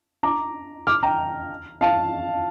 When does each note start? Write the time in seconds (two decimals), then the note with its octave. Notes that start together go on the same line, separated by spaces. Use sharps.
0.23 A#5 D6
0.87 D6 F6
1.03 G5 A#5
1.81 F5 A5